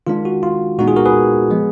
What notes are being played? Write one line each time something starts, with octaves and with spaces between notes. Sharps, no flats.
D#3 G#3 D4 F4
F#4
F4
A#2 G#3 B3 D#4 F#4
F4 G#4
F#4 A#4
G#4 B4
F3 G#3 B3